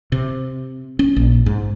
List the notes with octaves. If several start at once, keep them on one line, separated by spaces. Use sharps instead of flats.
C3
C#4
A#1
G#2